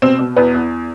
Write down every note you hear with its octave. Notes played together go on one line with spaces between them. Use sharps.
B2 C4
B2
E2 B3
E2